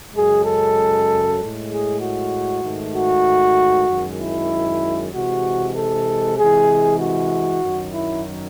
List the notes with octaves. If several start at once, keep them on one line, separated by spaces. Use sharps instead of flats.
F#2 C#3 G#3 G#4
A4
A2 G#3
G#4
F#4
G#2 D#3 A3
F#4
F#2 D#3 G#3
E4
C3 E3 G#3 F#4
A4
C3 E3 G#3 G#4
F#4
F#2 D#3 F#3
E4